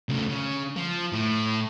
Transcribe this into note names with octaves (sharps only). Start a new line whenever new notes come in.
C#3 A3
C#3
F3
A2